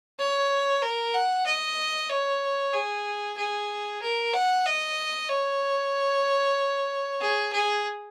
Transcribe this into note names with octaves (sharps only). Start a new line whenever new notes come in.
C#5
A#4
F#5
D#5
C#5
G#4
G#4
A#4
F#5
D#5
C#5
G#4
G#4